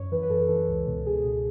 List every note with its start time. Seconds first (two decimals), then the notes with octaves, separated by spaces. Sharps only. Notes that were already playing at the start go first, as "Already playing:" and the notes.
Already playing: F#2 C#5
0.12 E3 B4
0.23 B4
0.30 F#2 A4
0.49 E3
0.68 C#2
0.86 B2
1.06 C#2 G#4
1.24 B2